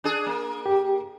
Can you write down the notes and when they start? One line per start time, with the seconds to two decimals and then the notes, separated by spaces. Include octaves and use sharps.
0.04 D4 G#4
0.26 A#3
0.66 G4